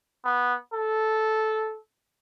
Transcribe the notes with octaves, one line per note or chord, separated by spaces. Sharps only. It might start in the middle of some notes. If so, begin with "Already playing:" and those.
B3
A4